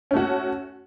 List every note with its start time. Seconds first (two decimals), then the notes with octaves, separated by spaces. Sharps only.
0.11 C#4
0.14 A3
0.16 F#4